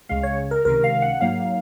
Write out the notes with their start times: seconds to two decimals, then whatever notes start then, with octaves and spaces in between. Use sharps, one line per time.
0.09 C#2 C#3 G#3 F5
0.23 C#5
0.51 A#4
0.65 C#2 C3 D#3 A#4
0.84 F5
1.02 F#5
1.21 G#2 F#3 A#3 F5